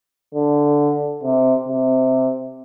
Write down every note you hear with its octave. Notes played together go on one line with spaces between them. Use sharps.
D3
C3
C3